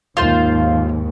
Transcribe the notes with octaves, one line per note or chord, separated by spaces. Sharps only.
D#2 G#2 F4 C5